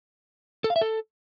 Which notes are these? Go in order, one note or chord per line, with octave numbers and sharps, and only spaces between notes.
A4
F5
E5
A4